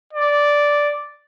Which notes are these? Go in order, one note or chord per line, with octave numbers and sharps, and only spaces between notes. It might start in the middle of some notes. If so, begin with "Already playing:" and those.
D5